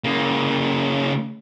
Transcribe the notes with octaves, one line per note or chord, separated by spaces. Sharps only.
C#3 A#3